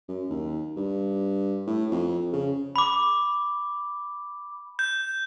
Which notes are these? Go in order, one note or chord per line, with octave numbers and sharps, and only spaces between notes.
F#2
D#2
G2
A2
F2
C#3
B5 D6
G6